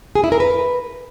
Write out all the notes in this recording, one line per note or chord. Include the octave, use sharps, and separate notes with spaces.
G#4
E4
A#4
B4